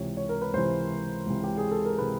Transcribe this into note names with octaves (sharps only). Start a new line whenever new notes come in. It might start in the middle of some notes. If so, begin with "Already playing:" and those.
Already playing: C#2 C3 E3 C#5
C#5
A#4
B4
C#2 C3 E3 C5
C#2 C3 E3
G4
G#4
A4
A#4
C3 E3 B4